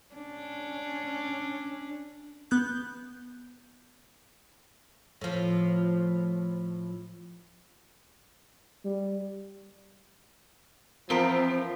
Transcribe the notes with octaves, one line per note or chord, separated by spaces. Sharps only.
C#4 D4
B3 F#6 G6
A2 F3
G3
E2 F3 B3 C4 A#4